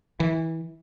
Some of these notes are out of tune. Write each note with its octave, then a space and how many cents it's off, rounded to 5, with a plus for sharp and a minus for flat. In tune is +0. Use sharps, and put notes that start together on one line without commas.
E3 -20